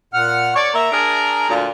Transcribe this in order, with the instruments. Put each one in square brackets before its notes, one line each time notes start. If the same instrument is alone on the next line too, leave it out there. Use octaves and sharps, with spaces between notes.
[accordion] A#2 F#5 F6
[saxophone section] C#5 D5 [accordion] C#6
[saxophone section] A#3 E5 [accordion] A#5
[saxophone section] D4 G#4 A#4
D2 A#2